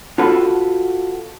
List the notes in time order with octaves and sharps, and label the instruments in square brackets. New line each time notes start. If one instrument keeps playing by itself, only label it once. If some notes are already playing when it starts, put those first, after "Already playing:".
[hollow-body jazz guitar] F4 F#4 A4 B4